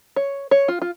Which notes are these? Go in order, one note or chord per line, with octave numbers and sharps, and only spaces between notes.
C#5
C#5
F4
F4